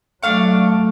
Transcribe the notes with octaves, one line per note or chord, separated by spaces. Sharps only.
F#3 A3 D4 F5 C#6